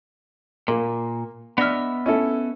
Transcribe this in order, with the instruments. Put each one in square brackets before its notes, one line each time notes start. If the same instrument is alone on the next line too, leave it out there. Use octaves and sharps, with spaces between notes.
[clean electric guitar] A#2 [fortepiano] A#3
[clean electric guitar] B3 D#5 E5 [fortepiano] D4 F6
[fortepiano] C#4 E4 A4